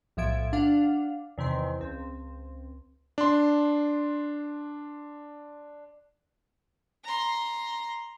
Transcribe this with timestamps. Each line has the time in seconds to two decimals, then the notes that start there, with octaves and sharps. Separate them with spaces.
0.17 B1 A2 F3 E5 G#6 D7
0.53 D4 F5 F#5
1.38 E2 C3 D#3 C6
1.80 C#2 C4
3.18 D4 C6
7.04 A#5 C6